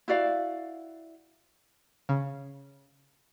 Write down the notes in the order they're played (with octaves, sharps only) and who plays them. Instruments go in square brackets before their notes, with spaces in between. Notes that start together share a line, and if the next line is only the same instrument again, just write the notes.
[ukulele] E4 F#4 D5 F5
[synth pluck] C#3